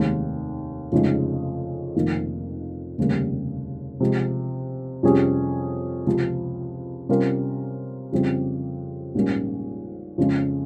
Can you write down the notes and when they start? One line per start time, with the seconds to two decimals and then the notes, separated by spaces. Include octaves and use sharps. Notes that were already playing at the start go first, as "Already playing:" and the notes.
Already playing: F1 D#2 D#3 G#3
0.92 F1 F2 C#3 G#3 D#4
1.96 F1 F2 D#3 A#3
2.98 F1 D#2 C#3 G3 A#3
4.00 C3 F3 G#3
5.03 F2 C3 G3 C#4 G#4
6.07 C#2 C3 F3
7.09 C3 G3 C#4 F4 A#4
8.12 F2 C#3 G3 C4 G4
9.15 A#1 G#2 G3 A#3 C#4
10.18 F2 C#3 G#3 C#4 F4